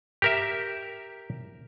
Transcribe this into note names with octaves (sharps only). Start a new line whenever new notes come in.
G4 A#4 E5